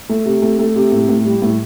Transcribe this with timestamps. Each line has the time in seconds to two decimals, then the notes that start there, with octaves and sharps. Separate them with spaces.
0.09 A3
0.25 C3
0.42 A3
0.59 A3
0.76 C3
0.92 A2
1.09 A2
1.25 G3
1.42 A2